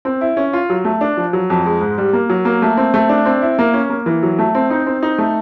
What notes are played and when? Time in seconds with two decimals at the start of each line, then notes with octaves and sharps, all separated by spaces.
0.05 C4
0.21 E4
0.37 C#4
0.53 F4
0.70 F#3
0.85 A3
1.01 D4
1.17 F3
1.33 F#3
1.50 F2
1.66 G#3
1.81 G#2
1.98 G3
2.13 A#3
2.30 F#3
2.45 A#3
2.62 A3
2.77 C4
2.94 A3
3.09 D4
3.25 C4
3.42 E4
3.59 A#3
3.74 C#4
3.90 A#3
4.06 E3
4.23 F#3
4.39 A3
4.55 C4
4.70 D#4
4.87 C4
5.03 D#4
5.18 A3